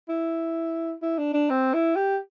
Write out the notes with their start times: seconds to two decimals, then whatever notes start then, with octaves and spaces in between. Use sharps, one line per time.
0.09 E4
1.03 E4
1.19 D4
1.34 D4
1.50 C4
1.74 E4
1.96 G4